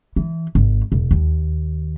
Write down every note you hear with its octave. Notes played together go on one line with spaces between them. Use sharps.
E3
G#1
E1
D#2